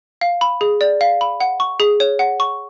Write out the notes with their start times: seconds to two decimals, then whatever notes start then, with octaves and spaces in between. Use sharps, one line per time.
0.21 F5
0.41 B5
0.61 G#4
0.81 D5
1.01 F5
1.21 B5
1.40 F#5
1.60 C#6
1.80 G#4
2.00 C#5
2.19 F#5
2.40 C#6